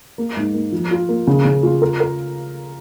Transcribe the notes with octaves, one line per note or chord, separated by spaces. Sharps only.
A#3
G#2
A#3
F3
F4
A#3
C#3
C#3
F4
A#4
A#4